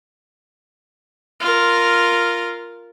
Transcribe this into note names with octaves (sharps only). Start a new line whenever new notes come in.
F4 A#4